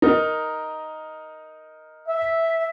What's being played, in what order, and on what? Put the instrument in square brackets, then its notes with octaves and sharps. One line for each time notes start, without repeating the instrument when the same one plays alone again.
[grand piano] D#4 A#4 D#5
[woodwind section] E5